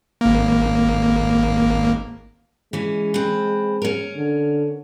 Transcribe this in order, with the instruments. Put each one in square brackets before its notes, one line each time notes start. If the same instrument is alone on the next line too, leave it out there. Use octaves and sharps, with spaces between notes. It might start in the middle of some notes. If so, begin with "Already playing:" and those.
[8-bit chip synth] G#1 A#3
[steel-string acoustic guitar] E3 C#4 [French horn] G#3
[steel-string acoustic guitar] C4 B4
C#4 A#4
[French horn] D3